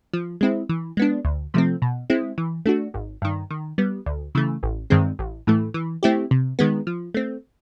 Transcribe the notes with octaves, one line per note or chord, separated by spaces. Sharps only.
F3
G#3 C4 E4
E3
G#3 B3 D4
D2
C3 F3 A3 C4
B2
G#3 C4 E4
E3
A3 D4 F#4
G#1
G2 D#3
D#3
G3 B3
D2
C#3 E3 A3
A1
G2 D#3 G#3 C4
A1
A2 E3 A3
E3
A3 C4 E4 G4
C3
D#3 G#3 B3
F3
A3 C4